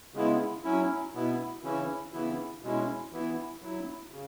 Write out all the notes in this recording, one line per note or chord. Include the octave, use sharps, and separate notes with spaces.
C#3 G#3 B3 E4
F#3 C#4 E4
B2 B3 E4
C#3 E3 C#4 E4
C#3 E3 B3 E4
B2 G#3 C#4 E4
E3 B3 E4
F#3 E4
C#3